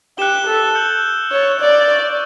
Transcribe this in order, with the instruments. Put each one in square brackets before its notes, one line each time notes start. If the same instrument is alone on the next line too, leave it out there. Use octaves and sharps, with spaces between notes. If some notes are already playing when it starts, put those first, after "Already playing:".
[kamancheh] G4 [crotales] F#6 C#7 E7 G7
[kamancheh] A4
[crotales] E6 G6 C#7 F#7
[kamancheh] C#5 [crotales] A6 E7 G7
[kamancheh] D5
[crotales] C#6 E6 A6 D7